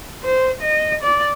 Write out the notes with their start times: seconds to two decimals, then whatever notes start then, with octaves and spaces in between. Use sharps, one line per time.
0.24 C5
0.62 D#5
1.03 D5